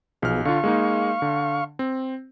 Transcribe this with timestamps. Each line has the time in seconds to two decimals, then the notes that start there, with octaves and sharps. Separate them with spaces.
0.22 B1 B2 F3 G#4 F6
0.45 D3 F4 F5 C#6
0.64 G#3 A#3 D#4
1.22 D3
1.79 C4